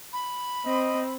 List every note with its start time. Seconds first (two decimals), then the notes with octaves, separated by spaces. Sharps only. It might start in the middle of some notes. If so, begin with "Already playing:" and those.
0.13 B5
0.65 C4 D#5